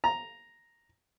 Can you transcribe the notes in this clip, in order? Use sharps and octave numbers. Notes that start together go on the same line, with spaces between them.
A#5